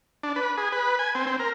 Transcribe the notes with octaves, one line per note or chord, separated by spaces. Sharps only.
D4
B4
G#4
B4
G#5
C4
C4
A#4